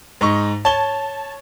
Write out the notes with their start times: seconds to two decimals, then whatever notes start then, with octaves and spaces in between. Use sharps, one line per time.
0.21 G#2 D#4 C#6
0.65 C#5 A5 G7